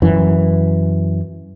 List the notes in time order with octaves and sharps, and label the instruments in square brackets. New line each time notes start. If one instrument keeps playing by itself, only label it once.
[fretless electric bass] F#2 E3